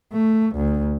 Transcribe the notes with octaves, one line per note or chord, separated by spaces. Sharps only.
A3
D2